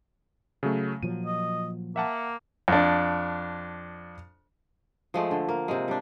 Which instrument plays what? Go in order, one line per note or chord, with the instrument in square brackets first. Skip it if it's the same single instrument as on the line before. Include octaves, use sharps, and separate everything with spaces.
[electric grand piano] C#3 F#3 A3
[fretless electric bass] A#2 F3 F#3 [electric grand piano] D#7
[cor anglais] D#5
[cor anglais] A#3 [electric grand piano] E5 F#5 A5
[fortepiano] F2 D4
[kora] F3 G#3 A3
D3
A#3
C3 G#3
G3 D4